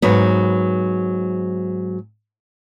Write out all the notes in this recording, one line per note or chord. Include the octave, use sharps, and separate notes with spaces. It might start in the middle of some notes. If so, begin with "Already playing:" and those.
G#2 F#3 B3